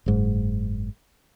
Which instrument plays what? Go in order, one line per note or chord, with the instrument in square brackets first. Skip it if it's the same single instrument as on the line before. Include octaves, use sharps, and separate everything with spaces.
[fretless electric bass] F#1 G#2